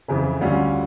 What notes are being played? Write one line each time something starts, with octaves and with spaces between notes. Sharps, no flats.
F2 C#3 E3
D2 D3 G3 C#4 F4